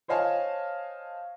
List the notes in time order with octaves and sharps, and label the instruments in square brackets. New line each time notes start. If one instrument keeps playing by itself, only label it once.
[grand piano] C5 C#5 D#5 F5 G#5 A5